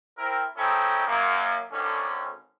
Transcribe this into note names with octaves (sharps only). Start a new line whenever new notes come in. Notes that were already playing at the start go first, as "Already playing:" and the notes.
C4 E4 A#4
G#3 C4 C#4 D#4 E4 A4
F#2 A#3
G#1 D3 C#4